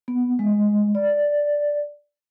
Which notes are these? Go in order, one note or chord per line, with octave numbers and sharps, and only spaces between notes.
B3
G#3
D5